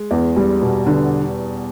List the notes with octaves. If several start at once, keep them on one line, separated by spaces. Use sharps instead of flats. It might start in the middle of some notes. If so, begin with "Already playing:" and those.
Already playing: G#3
E2
G3
B2
D3